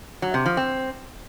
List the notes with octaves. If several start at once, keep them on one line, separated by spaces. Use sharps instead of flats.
F#3
C3
F3
C4